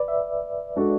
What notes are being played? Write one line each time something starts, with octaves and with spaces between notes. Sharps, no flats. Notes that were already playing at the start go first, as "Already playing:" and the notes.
Already playing: B4 D5
E5
G#3 D4 F#4 A4